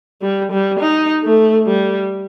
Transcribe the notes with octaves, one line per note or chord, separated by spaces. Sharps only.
G3
G3
D#4
A3
G3